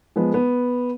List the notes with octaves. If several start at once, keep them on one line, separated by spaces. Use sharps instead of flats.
F3 G#3 B3
B3